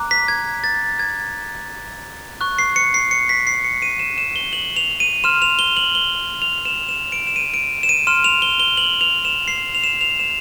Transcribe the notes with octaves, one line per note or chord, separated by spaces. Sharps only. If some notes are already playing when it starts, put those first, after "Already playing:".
Already playing: A#5 D6 F#6
B6
G#6
A6
G#6
C#6 F#6
C7
C#7
C7
C#7
B6
C7
C#7
D#7
E7
E7
G7
F#7
F7
D#7
C6 F6 E7
F7
G7
F#7
G7
F7
E7
E7
D7
E7
D#7
D7
E7
D#7
C6 F6 E7
F7
G7
G7
F#7
F7
E7
C7
F7
E7
F7
E7